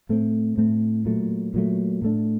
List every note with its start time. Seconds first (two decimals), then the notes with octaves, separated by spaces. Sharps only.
0.09 A2 A3 C4
0.58 A2 A3 C4
1.05 A#2 F#3 A3
1.54 A#2 F#3 A3
2.02 A2 A3 D4